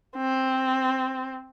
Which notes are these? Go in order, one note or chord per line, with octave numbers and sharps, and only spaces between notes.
C4